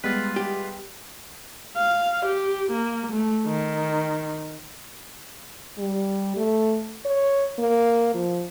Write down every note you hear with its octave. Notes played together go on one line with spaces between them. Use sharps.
G3 G#3 B3 F4 B4
G4
F5
G4
A#3
A3
D#3
G3
A3
C#5
A#3
F3